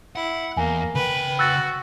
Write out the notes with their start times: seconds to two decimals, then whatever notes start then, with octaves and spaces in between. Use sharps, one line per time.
0.16 E4 F#5
0.57 E2 A#3 G#5
0.95 C#3 B4 G5
1.39 F#4 E6 F#6 A6